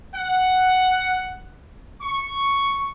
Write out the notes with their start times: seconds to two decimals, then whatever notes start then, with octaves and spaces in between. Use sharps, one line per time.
0.15 F#5
2.02 C#6